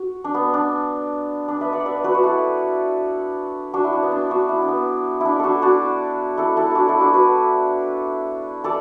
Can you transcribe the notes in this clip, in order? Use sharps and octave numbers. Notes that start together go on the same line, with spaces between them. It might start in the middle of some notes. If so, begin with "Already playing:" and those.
Already playing: F#4
D4
B3
D4
D4
B4 E5
D5 F#5
B4 E5
F#4 B4
F#4
E4 A4
D4 F#4
E4
D4
B3
D4
D4 F#4
E4
D4
B3
D4 E4
D4 F#4 A4
D4 F#4
E4 A4
E4 A4
D4 F#4 A4
E4 A4
D4 F#4
F#4 B4
A4 D5